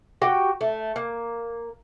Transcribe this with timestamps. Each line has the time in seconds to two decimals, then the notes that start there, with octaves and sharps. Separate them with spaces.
0.22 F#4 G4 G5
0.61 A3
0.96 A#3